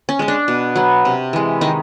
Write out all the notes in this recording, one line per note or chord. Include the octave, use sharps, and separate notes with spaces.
C#4
G#3 C#4
D4
B2
F#3 B3
C3
E3 G#3
D#3 D#4